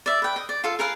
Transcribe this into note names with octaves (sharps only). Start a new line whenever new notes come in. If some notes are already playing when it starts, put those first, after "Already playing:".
D5 E5
B4 G5
D#5
D5
F4 A4 F5
G#4 A#4 B4 F5